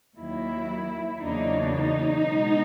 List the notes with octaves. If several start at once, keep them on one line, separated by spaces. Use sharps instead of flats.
D#2 D#3 F#3 A#3 E4
E2 C#3 F#3 A#3 D4 D#4
D#4
B2 G#3 B3